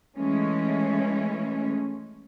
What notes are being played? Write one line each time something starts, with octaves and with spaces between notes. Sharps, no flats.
E3 G#3 A3 C#4